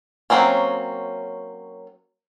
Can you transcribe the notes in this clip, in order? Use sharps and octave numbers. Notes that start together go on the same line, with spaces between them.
F#3 G3 A#3 C4 C#4